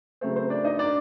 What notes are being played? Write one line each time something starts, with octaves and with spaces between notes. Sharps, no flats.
C#3 F#3 A3 C4
C4 C5
D4 D5
D#4 D#5
D4 D5